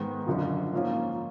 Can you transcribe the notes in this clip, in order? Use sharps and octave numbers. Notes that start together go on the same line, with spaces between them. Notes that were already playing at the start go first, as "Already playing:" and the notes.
Already playing: G#2 D#3 G#3 B3
F#1 F#2 D3 F3
G#2 F3 A#3 C#4 F4